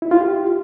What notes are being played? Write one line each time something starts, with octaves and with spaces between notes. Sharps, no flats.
E4
F4
G4